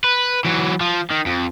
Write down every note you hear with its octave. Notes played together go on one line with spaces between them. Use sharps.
B4
E3 F#3
F3
D#3
F2